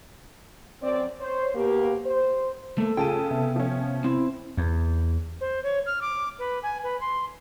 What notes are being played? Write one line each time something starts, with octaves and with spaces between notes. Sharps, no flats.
F#2 C4 D5
C5 C#5
B2 A#3 G4
C5
A3 A#3 A4
C#3 F4 G#4 G5 A5 D#7
C3 B3 E5
F3 C#4
C4 E4
E2
C5
C#5
F6
D6
B4
G#5
B4
C6